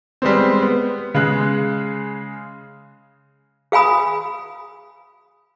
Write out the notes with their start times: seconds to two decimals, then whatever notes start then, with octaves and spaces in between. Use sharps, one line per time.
0.22 G3 G#3 B3 C4
0.62 B3
1.14 C#3 G#3 F#6
3.72 G#4 F5 G#5 B5 D#6